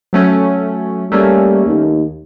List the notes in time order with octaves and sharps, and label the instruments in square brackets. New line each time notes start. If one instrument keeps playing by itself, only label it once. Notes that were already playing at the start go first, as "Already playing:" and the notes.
[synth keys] F#3 A3 C#4
[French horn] G3 [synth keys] A3 A#3 C#4
[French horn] D#2